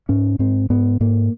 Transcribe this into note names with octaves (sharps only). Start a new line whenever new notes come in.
G#2 C#4
G#2 C4
G#2 B3
G#2 A#3